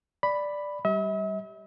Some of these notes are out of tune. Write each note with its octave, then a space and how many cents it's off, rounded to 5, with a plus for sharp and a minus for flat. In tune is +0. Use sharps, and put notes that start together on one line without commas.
D5 +0 B5 +0
G3 -10 E5 -45